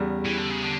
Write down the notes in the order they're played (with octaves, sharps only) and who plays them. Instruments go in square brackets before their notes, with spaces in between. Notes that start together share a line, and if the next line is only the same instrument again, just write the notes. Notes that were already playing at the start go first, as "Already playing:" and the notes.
Already playing: [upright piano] E2 C#3 G3
[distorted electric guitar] E3
D3
C#3
D3